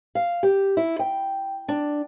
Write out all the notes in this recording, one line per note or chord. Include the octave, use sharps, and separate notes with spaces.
F5
G4
E4
G5
D4